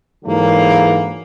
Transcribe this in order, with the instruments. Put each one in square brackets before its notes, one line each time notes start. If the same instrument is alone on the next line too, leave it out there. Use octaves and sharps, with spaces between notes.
[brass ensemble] G#2 D3 E3 F#3 G#3 A#3